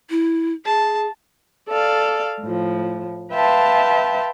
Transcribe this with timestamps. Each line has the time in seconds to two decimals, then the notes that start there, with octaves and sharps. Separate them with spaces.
0.10 E4
0.65 G#4 A5
1.68 A4 D5 F5
2.41 A2 F3
3.34 B4 E5 F5 G5 A5 C6